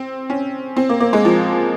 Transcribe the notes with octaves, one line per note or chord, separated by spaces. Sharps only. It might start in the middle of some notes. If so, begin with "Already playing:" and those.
Already playing: C4
C#4
C4
A#3
A#3
G#3
F3